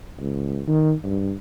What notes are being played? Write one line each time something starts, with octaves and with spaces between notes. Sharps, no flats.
C#2
D#3
G2